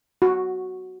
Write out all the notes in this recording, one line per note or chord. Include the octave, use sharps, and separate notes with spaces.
F#4